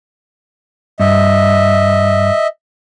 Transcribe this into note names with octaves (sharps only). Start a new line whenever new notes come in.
G2 D#5 E5